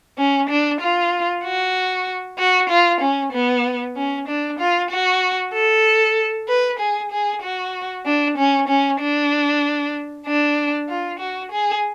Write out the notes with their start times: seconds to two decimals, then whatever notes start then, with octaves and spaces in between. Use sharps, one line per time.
0.18 C#4
0.49 D4
0.81 F4
1.44 F#4
2.38 F#4
2.70 F4
3.01 C#4
3.33 B3
3.96 C#4
4.28 D4
4.59 F4
4.90 F#4
5.54 A4
6.48 B4
6.79 G#4
7.12 G#4
7.42 F#4
8.06 D4
8.38 C#4
8.68 C#4
9.00 D4
10.26 D4
10.89 F4
11.20 F#4
11.52 G#4